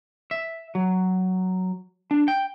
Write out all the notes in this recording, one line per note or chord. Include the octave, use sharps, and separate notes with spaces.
E5
F#3
D4
G5